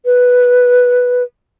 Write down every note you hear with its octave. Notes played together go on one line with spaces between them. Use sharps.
B4